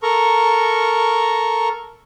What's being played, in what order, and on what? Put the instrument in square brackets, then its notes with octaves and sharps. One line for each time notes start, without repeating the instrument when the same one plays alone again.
[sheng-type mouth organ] A4 A#4 A#5 C#6